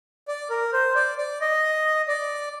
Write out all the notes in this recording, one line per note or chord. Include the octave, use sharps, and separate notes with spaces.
D5
A#4
C5
D5
D5
D#5
D5